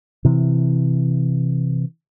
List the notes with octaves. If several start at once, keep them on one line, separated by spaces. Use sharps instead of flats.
C3 E3